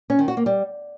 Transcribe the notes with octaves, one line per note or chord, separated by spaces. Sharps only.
C#4
D#3
F#4
A#3
G3